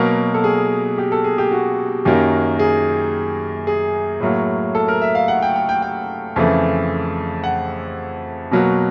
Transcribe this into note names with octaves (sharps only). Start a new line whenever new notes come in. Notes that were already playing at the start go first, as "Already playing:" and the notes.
Already playing: B2 F#3 A#3 A#4
A4
G#4
G4
A4
G#4
G4
F#4
F#2 D#3 F#3 A#3 G4
G#4
G#4
A2 F#3 A#3
A4
A#4
E5
F5
F#5
G5
G5
G5
G5
F2 C#3 E3 A3
F#5
B2 F#3 A#3